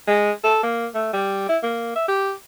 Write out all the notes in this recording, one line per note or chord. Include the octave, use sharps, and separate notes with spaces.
G#3
A4
A#3
A3
G3
E4
A#3
E5
G4